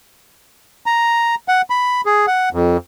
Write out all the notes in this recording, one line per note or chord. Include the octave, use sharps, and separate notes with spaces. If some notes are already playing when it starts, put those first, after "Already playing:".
A#5
F#5
B5
G#4
F#5
F2